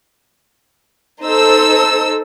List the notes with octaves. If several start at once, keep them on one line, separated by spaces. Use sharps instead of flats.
D#4 A4 C5 E6